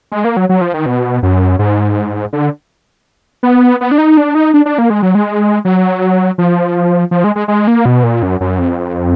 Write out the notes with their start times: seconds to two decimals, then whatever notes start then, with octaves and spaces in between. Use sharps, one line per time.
0.12 G#3
0.24 A#3
0.37 F#3
0.49 F#3
0.61 F3
0.74 D#3
0.86 B2
1.23 F#2
1.59 G#2
2.33 D3
3.43 B3
3.81 B3
3.91 D4
3.98 D#4
4.17 D4
4.35 D#4
4.54 D4
4.66 D4
4.78 A#3
4.90 G#3
5.02 F#3
5.15 G#3
5.65 F#3
6.38 F3
7.11 F3
7.24 G#3
7.36 G#3
7.48 G#3
7.67 A#3
7.86 B2
8.03 A#2
8.23 F#2
8.41 F#2
8.58 F2